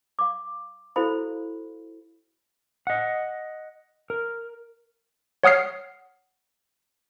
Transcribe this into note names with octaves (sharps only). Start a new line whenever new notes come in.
F5 D6
E4 F#4 A4 C5 F5 B5
D#5 F#5
A#4
C#5 F#5 D#6 F6 C7